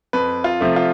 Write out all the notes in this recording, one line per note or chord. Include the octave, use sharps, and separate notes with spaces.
F2 B4
F4
C3 F3 A3
F4